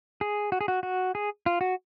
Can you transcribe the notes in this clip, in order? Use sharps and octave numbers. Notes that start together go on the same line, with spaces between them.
G#4
F#4
G#4
F#4
F#4
G#4
F4
F#4